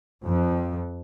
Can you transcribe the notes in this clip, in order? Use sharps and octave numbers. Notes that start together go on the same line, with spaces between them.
F2